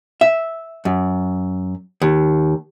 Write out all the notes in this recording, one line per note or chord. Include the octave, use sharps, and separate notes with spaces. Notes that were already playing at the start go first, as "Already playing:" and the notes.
E5
F#2
D#2